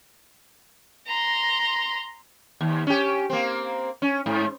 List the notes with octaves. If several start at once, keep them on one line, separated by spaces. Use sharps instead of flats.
A#5 C6
D#2
C#4 G4
A#3 C4
C#4
G#2